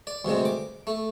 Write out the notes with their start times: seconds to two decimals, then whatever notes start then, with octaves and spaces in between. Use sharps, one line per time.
0.07 D5
0.25 D2 G2 C3 G#3
0.45 D6
0.87 A3